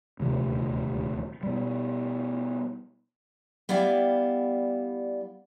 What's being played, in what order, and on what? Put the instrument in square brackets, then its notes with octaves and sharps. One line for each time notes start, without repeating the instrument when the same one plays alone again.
[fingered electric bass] D#1 D2 C3 F3
B2 G3
[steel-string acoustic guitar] G3 B3 E4 D5 F5 G5